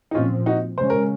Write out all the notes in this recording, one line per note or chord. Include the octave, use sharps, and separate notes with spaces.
D#4
A#2 F3 C4 C#4 F4
D#4 F#4
C#3 G#3 C#4 C5
A#4